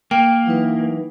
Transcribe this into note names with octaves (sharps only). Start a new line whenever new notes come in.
A#3 G5
E3 F#3 D#4 B4